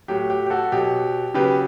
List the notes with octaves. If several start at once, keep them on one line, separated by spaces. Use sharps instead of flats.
A2 F#3 G4
G4
G4
F#4 A4
B2 F#3 G4
C#3 F#3 G4 B4